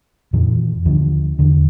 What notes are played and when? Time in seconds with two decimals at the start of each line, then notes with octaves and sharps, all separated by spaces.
0.33 F2 A#2 D#3 E3
0.85 D#2 D3 F3
1.39 E2 D3